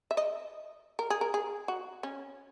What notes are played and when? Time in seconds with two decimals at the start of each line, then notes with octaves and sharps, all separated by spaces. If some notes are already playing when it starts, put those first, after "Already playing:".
0.11 E5
0.17 D#5
0.99 A#4
1.10 G#4
1.21 A#4
1.34 G#4
1.68 F#4
2.03 C#4